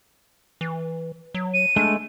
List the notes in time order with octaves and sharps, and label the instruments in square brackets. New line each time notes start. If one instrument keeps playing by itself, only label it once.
[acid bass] E3
F#3
[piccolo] D#7
[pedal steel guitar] G#3 A3 [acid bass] D4